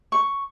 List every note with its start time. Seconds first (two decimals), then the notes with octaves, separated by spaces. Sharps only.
0.12 C#6